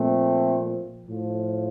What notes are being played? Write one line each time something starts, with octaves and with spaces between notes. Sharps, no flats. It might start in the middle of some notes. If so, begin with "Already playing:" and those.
Already playing: A#2 F3 A3 C4
A2 F3